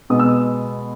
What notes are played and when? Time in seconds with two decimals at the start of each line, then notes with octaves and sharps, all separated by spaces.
0.10 B2 G#3 B3 D#6
0.19 E6
0.29 D#6